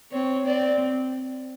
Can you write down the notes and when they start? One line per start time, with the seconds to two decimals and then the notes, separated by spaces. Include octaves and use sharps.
0.12 C4 C#5
0.46 C4 D5